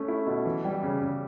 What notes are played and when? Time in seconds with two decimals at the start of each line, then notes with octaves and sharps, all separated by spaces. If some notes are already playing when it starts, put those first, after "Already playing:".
Already playing: A3 C#4
0.08 E4
0.27 B2
0.45 E3
0.64 G3
0.83 C#3
1.01 C#3